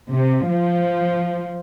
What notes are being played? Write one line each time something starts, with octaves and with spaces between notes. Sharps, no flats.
C3
F3